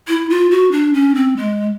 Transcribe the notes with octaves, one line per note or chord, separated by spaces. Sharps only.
E4
F4
F#4
D4
C#4
C4
G#3